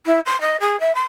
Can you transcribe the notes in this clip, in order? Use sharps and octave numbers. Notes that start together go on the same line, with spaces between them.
E4
C6
D#5
G#4
E5
C6